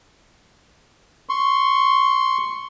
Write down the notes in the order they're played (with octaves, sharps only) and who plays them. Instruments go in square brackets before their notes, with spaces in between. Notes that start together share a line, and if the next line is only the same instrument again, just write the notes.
[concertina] C6 C#6